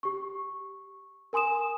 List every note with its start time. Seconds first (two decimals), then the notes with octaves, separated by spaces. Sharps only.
0.03 G4 C#6
1.33 A#4 G#5 C6 D#6 E7